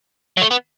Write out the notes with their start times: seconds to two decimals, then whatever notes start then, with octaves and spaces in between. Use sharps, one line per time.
0.37 F#3
0.42 A3
0.51 B3